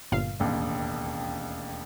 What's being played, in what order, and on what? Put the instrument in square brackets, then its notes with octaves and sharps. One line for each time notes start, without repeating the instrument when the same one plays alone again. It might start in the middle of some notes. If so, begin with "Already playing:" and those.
[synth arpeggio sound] G1 A#2 F5
[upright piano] E1 A1 D#2